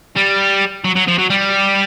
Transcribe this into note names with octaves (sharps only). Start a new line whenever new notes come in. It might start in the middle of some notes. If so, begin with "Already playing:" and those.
G3
F#3
F#3
F3
F#3
G3